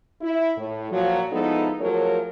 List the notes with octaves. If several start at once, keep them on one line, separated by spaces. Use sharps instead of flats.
E4
A2
A#2 F3 F#3
F3 G#3 B3 D#4 E4 A4
F3 F#3 A3 G#4 A#4 C#5